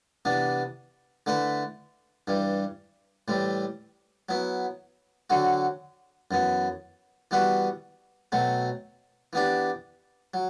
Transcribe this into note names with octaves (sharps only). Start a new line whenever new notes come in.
C3 E3 B3 D4
D3 A3 E4 B4
G2 E3 G3
A2 E3 G3 C4
F#3 B3 E4
D3 F#3 C4 F#4
F#2 E3 B3
E3 G3 B3 F#4 B4
B2 F#3 A3 C4
E3 B3 D4 G4
F#3